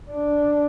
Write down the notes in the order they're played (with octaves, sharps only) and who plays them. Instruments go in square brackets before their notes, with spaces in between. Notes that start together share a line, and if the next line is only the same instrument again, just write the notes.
[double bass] D4